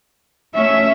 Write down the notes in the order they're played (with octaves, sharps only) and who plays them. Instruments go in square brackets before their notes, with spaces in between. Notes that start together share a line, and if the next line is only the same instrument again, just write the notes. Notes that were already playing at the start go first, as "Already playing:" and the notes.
[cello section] A3 C#4 [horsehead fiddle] E5